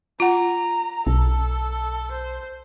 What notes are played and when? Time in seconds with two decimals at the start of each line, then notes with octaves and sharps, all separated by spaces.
0.20 F4 F#5 A#5
1.07 B1 A4
2.12 C5